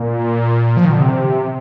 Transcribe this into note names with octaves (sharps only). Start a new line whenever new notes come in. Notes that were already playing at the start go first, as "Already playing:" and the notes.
Already playing: A#2
F3
D#3
D3
C3